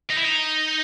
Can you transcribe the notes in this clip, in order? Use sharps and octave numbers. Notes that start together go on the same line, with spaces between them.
D#4
E4
D#4